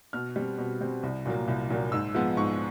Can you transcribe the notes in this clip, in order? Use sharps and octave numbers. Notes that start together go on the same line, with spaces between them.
B2 F6
G3 C4
B2
G3 C4
C2
A#2 F#3 A#3
C2
A#2 F#3 A#3
G#2 E6
F3 G#3 B3
G#2 C#6